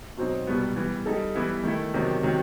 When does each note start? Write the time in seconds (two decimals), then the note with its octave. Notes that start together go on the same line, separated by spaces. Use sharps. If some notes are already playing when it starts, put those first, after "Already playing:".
0.17 B2 F#3 C4 D#4
0.47 C2 B2 G3 B3
0.76 E3 G3 B3
1.06 G3 D#4 A4
1.35 E3 G3 B3 E4
1.64 D#3 A3 E4
1.94 E2 C3 D#3 F#3
2.23 C3 D#3 F#3